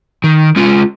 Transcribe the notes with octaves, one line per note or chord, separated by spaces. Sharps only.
D#3
G#3 C#4 F4